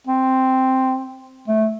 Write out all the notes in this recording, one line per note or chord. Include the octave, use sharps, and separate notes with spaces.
C4
A3